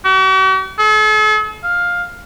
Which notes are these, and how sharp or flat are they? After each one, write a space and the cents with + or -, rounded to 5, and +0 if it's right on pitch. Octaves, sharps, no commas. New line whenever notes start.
F#4 +45
A4 -45
F5 +10